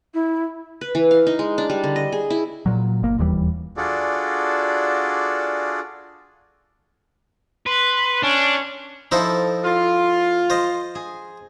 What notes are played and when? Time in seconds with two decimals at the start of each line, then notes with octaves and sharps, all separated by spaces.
0.14 E4
0.81 B4
0.95 E3
1.11 F5
1.27 D#4
1.39 G#3
1.58 D4
1.70 G3
1.84 D3
1.96 D#5
2.12 G#4
2.30 E4
2.66 A#2 F#3
3.03 G1 A#3
3.18 E1 D#2 E3 G3
3.77 D4 F4 F#4 G#4 A4 D5
7.66 B4 C6
8.23 C#4 D4
9.12 F3 D#4 E4 A4 C5
9.65 F4
10.50 C5 D#5
10.95 G#4